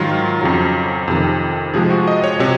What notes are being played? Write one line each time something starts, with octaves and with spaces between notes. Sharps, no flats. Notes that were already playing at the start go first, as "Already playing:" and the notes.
Already playing: G#2 D#3 F#3 F4
F2 C#3 F#3
F2 C3 D#3
C3 F3 G#3 G#4
F#4
D#5
C#5
C3 F#3 C#5